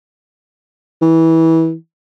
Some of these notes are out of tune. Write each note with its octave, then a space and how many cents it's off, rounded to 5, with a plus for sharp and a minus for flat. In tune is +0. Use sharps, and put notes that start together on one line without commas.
E3 -20